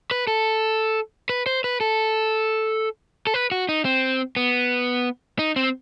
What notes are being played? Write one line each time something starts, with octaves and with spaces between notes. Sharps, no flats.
B4
A4
B4
C5
B4
A4
A4
B4
F#4
D#4
C4
B3
D#4
C4